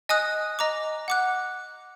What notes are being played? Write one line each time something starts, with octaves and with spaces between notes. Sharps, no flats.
D#5 G#5 D#6 F#6
D#5 A#5 D6
F#5 D6 F#6